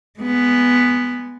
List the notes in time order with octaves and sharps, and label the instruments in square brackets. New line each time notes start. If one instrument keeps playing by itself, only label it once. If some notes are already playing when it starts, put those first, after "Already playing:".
[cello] G#3 B3